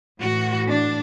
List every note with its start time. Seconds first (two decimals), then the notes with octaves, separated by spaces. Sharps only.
0.20 A2 E3 F#4
0.69 D4